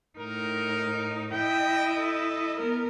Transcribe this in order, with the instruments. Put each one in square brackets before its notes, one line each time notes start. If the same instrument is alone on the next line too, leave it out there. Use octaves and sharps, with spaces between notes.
[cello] A2 D#4 [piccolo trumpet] A#4
[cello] E4 D#5 [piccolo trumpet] G5
[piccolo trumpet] A4
[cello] B3 A#4